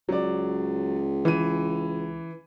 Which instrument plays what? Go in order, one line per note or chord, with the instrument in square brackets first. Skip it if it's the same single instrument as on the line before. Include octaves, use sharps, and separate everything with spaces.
[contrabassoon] C#2 [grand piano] F#3 D5
[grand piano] E3 D#7